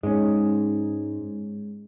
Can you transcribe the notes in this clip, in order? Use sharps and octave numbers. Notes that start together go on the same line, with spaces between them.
G#2 G#3 C#4